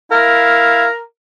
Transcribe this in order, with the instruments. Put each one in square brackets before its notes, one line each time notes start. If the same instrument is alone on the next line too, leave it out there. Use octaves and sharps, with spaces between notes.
[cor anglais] E4 [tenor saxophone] A#4 [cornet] F5